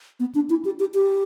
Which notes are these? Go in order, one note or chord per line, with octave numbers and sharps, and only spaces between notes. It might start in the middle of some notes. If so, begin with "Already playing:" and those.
B3
D4
E4
G4
G4
G4